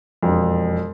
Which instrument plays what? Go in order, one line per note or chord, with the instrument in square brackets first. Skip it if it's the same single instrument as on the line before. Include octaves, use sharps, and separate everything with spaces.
[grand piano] E1 F2